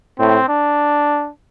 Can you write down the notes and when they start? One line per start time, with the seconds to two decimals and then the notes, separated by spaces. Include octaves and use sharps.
0.19 A2 C4
0.49 D4